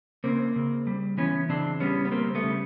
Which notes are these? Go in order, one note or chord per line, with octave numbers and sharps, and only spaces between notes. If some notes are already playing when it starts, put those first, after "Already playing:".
C#3 A#3 C4
C#3
G3
E3 B3 C#4
C#3 C4 D4
G3 B3 C#4
B3
G3 A#3 C4
A3 B3
C#3